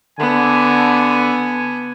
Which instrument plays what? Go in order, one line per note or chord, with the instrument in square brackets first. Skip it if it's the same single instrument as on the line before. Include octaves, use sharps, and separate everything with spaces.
[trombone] D3 [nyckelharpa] B3 [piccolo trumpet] G#5